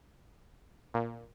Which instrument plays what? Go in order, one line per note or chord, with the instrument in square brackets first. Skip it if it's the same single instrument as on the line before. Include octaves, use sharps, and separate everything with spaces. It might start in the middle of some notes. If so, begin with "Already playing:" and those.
[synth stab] A#2